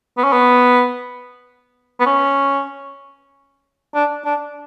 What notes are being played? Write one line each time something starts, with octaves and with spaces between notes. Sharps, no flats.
B3
C#4
B3
B3
C#4
D4
D4